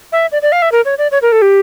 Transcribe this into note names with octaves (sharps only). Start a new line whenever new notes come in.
E5
D5
D5
F5
E5
A#4
C#5
D5
C#5
A#4
A4
G4